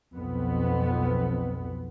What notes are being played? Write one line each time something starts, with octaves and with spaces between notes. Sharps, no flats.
B1 F2 B3